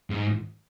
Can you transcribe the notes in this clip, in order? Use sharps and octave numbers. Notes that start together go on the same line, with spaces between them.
G#2